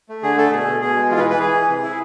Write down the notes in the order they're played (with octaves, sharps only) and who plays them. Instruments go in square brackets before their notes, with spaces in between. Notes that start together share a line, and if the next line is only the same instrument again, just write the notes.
[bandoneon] A3
D3 G#4
A3 A4
B2 G#4
B2
B2 G#4
G#3
E3 F4
B4
E3
B4
E3 G#4
E3
C3
E4